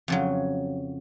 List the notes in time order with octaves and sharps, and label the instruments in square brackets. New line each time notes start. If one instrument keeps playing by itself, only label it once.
[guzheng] F2 C#3 F#3